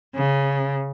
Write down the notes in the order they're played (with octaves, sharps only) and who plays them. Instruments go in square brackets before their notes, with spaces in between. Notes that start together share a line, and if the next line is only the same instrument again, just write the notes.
[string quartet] C#3